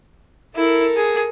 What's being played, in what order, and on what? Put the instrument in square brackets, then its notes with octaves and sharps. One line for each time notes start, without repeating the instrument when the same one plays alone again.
[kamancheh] E4 [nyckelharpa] A4 A#4
[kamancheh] G#4